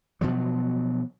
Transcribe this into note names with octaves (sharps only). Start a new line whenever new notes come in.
B2 F3 F#3